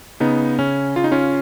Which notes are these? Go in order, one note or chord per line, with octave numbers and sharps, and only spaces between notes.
C#3 B3 D#4
C#3 C#4
C#3 F4
D#4
C#4 F4